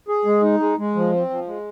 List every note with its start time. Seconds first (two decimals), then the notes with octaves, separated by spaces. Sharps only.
0.08 G#4
0.25 G#3
0.42 D#4
0.60 G#3
0.78 G#3
0.95 F3
1.12 C4
1.30 F3
1.47 G#3